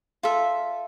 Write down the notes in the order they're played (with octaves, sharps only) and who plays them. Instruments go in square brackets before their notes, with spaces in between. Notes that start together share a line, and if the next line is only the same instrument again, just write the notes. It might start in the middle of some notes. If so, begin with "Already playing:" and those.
[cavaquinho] F4 A4 E5